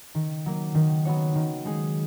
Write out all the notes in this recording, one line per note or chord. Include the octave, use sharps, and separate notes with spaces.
D#3
F#3 A#3
D#3
F#3 B3 F#4 C#5
D#3
G#3 D#4 G#4